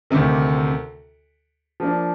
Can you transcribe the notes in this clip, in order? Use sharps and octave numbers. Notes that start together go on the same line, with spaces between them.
D2 C3 D#3
F3 A#3 D4